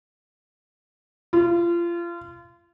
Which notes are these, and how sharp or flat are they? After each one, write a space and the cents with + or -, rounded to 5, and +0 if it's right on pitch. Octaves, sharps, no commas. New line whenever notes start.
F4 -30